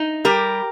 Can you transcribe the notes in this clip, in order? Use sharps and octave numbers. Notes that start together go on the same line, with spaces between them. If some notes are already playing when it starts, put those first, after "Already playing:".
Already playing: D#4
G3 G4 A#4